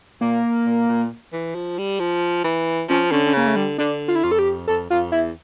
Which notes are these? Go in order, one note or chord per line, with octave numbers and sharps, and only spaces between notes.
A#2 A#3
A#2
A#2
E3
F3
G3
F3
E3
F3 C#4
D3 C#4
C#4
C#3 A#3
A3
D3 G3
D3 D4
F4
E4
F2 F4
A4
G4
F2 A4
F2 F4
E2 E4